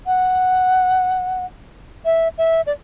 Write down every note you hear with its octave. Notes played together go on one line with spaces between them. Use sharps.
F#5
E5
E5
D5